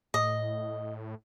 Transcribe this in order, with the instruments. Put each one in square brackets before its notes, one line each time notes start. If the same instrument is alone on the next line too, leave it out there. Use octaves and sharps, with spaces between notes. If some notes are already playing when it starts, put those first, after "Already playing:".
[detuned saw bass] A2 [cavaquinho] D#5